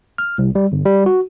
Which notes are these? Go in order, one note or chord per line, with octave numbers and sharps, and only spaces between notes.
F6
C2
G3
G1
G3
F#4